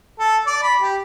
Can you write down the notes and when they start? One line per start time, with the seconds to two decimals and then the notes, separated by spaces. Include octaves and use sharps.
0.19 A4
0.47 D5
0.62 B5
0.81 G4